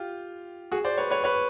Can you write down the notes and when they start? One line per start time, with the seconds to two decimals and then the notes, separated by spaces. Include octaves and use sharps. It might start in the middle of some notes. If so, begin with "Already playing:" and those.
Already playing: F4 G4
0.72 F#4 G#4
0.84 C5 D5
0.98 B4 C#5
1.11 B4 C#5
1.24 B4 C#5